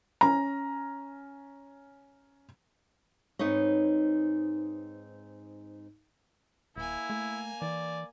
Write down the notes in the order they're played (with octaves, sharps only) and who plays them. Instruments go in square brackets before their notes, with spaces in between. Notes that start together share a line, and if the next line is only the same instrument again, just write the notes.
[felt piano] C#4 A#5
[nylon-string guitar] G#2 C4 D#4 B4 C#5 D#5
[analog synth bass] D#1 [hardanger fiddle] A#3 G#5 [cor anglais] E4
[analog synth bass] A3
[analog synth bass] E3 [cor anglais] D5